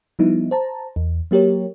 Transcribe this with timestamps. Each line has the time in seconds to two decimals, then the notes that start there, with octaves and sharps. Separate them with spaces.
0.19 F3 G3 B3 D#4 E4
0.51 C5 A5 A#5
0.96 E2
1.31 F#3 A#3 G4 A#4 C#5